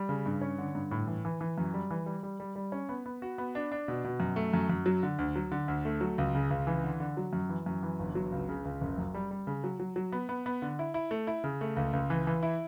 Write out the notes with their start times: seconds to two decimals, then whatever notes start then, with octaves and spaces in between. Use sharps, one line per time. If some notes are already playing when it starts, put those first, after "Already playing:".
Already playing: G3
0.09 C#3
0.26 G2
0.41 C#4
0.58 D3
0.75 G2
0.91 A2
1.07 E3
1.25 E3
1.41 E3
1.58 F#2
1.74 G3
1.91 E3
2.06 G3
2.23 G3
2.40 G3
2.56 G3
2.72 C#4
2.89 B3
3.06 B3
3.22 F#4
3.38 B3
3.55 D4
3.72 D4
3.88 B2
4.04 B2
4.20 F#2
4.36 A3
4.54 F#2
4.70 F#2
4.86 F#3
5.03 D3
5.19 D2
5.36 F#3
5.51 D3
5.68 D2
5.85 A3
6.01 F#3
6.18 C#2
6.35 C#3
6.51 C#2
6.67 E3
6.84 D3
7.00 D3
7.17 F#3
7.33 F#2
7.49 E3
7.66 F#2
7.83 E3
7.99 G1
8.15 F#3
8.32 C#2
8.49 C#3
8.65 C#2
8.81 F#1
8.98 F#2
9.14 G3
9.31 G3
9.47 C#3
9.64 F#3
9.80 F#3
9.96 F#3
10.12 B3
10.29 B3
10.46 B3
10.62 D3
10.79 E4
10.94 E4
11.11 A3
11.27 E4
11.44 C#3
11.61 A3
11.77 C#2
11.93 C#2
12.10 E3
12.27 E3
12.43 E4